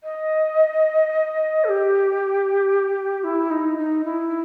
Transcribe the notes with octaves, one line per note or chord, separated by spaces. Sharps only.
D#5
A4
G4
E4
D#4
D#4
E4